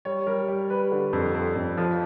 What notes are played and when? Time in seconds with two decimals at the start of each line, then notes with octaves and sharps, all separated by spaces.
0.05 G3 C#5
0.27 G3 A#4
0.48 G3
0.70 G3 B4
0.92 D3
1.13 F2
1.35 F2
1.56 F2
1.77 F3